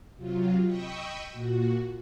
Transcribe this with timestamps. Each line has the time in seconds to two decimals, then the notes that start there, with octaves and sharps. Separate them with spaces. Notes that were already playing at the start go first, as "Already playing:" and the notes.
0.16 C3 F#3 F4
0.63 D#5 G5 B5 C#6 D#6 E6
1.30 A#2 F#4